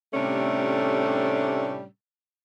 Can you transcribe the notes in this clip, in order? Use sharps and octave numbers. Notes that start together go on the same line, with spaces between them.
A2 C3 G3 A3 C#4 D4